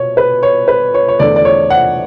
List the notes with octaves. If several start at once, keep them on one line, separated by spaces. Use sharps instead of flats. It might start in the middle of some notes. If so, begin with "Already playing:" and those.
Already playing: B2 C#5
B4
C#5
B4
C#5
C#5
E2 D3 A3 D5
D5
C#5
F#5